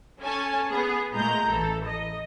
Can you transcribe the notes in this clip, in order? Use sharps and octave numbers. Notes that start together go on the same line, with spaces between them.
C#4 A4 G#5 A5
B3 G#4
A#2 G#3 A3 A#5 G6
A1 E3 A4
D#5